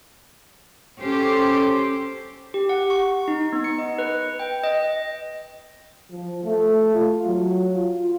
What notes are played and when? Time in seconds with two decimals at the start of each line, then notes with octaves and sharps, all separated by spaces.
1.00 C#4 G4 A4 C5
2.54 G4
2.69 F#5
2.90 C#6
3.28 D#4
3.53 B3
3.64 C#7
3.78 D#5
3.98 B4
4.39 G5
4.64 D#5
6.10 F3
6.44 A3
6.95 F4
7.26 F#3
7.75 F4